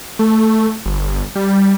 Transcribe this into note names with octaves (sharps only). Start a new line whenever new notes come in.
A3
G1
G3